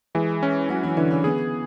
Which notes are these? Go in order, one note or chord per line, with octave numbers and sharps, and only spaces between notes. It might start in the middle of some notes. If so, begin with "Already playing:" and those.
E3 G#3 G#4
C#4
F#3 C#4 F#4
E3 E4
D3 E3 D4
C#3 C#4
B3 G#4